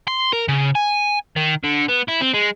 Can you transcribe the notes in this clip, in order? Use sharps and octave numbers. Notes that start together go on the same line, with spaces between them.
C6
A#4
C#3
G#5
D#3
D3
B3
E4
C4
G#3